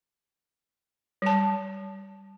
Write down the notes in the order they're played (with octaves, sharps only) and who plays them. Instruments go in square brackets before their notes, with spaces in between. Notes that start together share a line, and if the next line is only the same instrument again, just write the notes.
[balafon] G3 A5